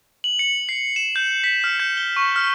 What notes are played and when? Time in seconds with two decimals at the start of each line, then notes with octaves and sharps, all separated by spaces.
0.24 F#7
0.39 C#7
0.69 C7
0.96 E7
1.16 G6
1.44 B6
1.64 F6
1.80 G6
1.97 G7
2.17 C#6
2.36 F6